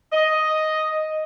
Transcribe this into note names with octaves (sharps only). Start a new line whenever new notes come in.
D#5